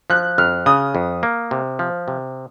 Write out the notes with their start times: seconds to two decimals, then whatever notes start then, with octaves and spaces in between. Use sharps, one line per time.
0.10 F3 F#6
0.38 F2 F6
0.66 C#3 D#6
0.95 F2
1.23 A#3
1.51 C3
1.79 F3
2.08 C3